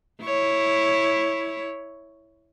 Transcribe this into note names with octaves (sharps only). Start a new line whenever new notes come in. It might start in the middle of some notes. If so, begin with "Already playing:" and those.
E4 C#5